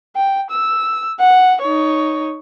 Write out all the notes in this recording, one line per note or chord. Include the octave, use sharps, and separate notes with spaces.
G5
E6
F#5
D#4 C#5